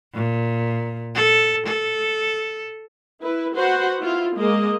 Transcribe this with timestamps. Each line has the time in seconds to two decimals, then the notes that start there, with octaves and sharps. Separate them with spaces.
0.15 A#2
1.15 A4
1.67 A4
3.22 E4 B4
3.55 F#4 B4 C5 F#5
4.00 E4 F4
4.36 G#3 A#3 D#5